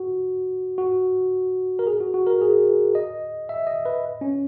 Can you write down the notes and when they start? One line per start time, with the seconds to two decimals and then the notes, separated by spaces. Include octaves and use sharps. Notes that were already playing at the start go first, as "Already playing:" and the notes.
Already playing: F#4
0.78 F#4
1.79 A#4
1.87 G#4
2.00 F#4
2.14 F#4
2.27 A#4
2.41 G#4
2.95 D#5
3.49 E5
3.67 D#5
3.86 B4
4.21 C#4